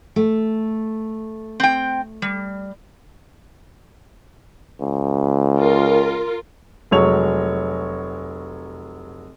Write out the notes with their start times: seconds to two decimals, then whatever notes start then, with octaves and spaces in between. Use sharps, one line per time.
0.16 A3
1.60 C4 G5
2.22 G3
4.81 C#2
5.57 F4 A#4
6.91 F1 F#3 G#3 C#5 F7